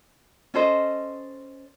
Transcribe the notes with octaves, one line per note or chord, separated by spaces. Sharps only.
C#4 A4 C5 D#5